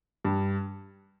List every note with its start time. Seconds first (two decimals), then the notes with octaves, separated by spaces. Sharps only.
0.25 G2